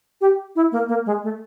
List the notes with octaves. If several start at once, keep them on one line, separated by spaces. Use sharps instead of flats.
G4
E4
A#3
A#3
G#3
A3